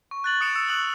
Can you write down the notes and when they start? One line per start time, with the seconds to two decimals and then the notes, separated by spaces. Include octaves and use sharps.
0.11 C#6
0.24 F#6 A6 F#7
0.41 D#6 A6 C#7 D7 E7 F7
0.55 D#6 E6 C#7 E7
0.69 C#6 D#6 E6 F#6 F7 F#7